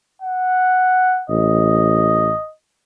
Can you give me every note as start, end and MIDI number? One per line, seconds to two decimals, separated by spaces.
0.22 1.23 78
1.30 2.31 33
1.30 2.50 75